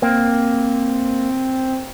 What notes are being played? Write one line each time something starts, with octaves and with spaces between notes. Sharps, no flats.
A#3 C4